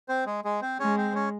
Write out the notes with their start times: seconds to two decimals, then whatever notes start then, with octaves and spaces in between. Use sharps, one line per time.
0.08 C4 C5
0.26 G#3 G#4
0.45 G#3 G#4
0.62 C4 C5
0.80 G#3 C#4 C#5
0.97 C4 C5
1.15 C#4 C#5